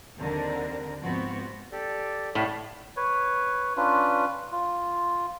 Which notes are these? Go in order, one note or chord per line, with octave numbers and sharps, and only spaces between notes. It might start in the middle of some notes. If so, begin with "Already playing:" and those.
D#2 D3 C4 D4 A#4
G#2 F3 B3 C4 F#4
G4 A4 D5
A2 C#5 D5 F5
B4 C#5
C#4 D4 F4 B4
F4